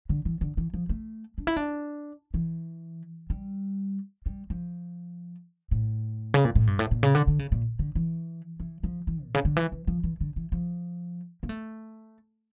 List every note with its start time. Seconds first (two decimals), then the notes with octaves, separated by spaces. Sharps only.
0.09 D3
0.25 E3
0.41 D3
0.57 E3
0.74 F3
0.89 A3
1.38 D4
1.47 E4
1.57 D4
2.34 E3
3.30 G3
4.26 G3
4.50 F3
5.71 A2
6.34 C#3
6.45 A#2
6.55 A2
6.67 G2
6.79 A2
6.91 A#2
7.03 C#3
7.15 D3
7.27 D3
7.39 C#3
7.52 A#2
7.79 D3
7.95 E3
8.60 E3
8.83 F3
9.07 E3
9.24 A#2
9.35 C#3
9.45 D3
9.57 E3
9.72 E3
9.87 F3
10.03 E3
10.21 D3
10.36 E3
10.52 F3
11.43 A#3
11.49 A3